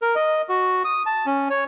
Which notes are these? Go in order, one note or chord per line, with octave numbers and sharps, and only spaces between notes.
A#4
D#5
F#4
D#6
A5
C#4
C#5